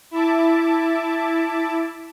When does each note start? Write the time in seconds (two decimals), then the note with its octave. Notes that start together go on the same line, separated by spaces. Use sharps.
0.11 E4 E5 A5 D6